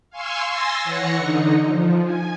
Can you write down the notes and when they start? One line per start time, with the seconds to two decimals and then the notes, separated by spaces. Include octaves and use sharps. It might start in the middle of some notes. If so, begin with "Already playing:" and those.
0.10 F5 G#5 C6 C#6 E6
0.50 G#5 C6 E6 A6 A#6
0.84 E3 C#5 F#5 A#6 C#7
1.17 D3 D#4
1.62 F3
2.03 G#5